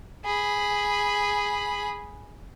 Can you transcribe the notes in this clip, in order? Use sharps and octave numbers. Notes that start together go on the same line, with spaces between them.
G#4 B5